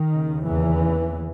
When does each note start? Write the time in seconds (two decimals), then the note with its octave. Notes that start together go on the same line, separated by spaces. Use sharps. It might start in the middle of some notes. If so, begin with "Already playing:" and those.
Already playing: D#3
0.11 D#2 C#3
0.44 E2 E3